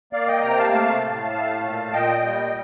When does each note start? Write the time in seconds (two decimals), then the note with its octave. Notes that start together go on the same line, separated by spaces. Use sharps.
0.13 A#3 D5 F5
0.28 D#5 G5
0.43 C3 G5 A#5
0.58 F5 A5
0.72 A3 F5 A5
1.02 A2
1.33 A3
1.62 A#2
1.93 A#2 D#5 G5
2.22 G3